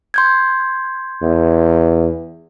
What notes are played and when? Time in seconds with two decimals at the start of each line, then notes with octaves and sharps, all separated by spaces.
0.14 C6 G6 G#6
1.22 E2